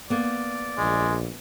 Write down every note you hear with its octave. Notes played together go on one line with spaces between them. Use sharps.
A#3 B3 D5
A#1 G#3